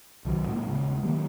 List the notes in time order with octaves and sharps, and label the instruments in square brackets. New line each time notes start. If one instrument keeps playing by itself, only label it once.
[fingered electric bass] B1 D#3 F3 F#3
A2 G#3 A#3
D#1 C#3 G#3
D#3 F#3 G3 A#3